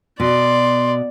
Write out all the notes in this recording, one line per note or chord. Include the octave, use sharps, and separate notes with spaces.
B2 D5 C6